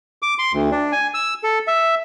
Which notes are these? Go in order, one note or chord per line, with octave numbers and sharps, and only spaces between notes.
D6
C6
D2
D4
G#5
E6
A4
E5